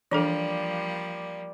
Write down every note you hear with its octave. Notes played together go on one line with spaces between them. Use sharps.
E3 F3 G3 A#3 D4 A4 D5